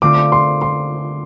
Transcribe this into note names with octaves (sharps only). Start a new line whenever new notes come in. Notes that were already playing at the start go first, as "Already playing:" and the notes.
D3 A3 C4 F4 D6
C6
C6